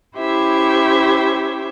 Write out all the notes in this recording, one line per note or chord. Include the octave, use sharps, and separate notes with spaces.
C#4 E4 G4 C5 E5